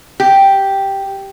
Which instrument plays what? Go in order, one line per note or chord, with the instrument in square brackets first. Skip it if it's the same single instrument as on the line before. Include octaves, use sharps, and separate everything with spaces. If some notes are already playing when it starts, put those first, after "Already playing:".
[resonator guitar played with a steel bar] G4